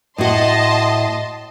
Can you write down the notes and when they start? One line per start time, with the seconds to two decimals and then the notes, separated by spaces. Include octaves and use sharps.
0.18 A2 F#4 D#5 A5 C6